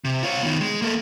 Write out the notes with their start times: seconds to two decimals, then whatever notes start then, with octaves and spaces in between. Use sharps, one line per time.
0.05 C3
0.23 F4 C#5
0.43 D#3 B3
0.60 G#3
0.82 A#3 A4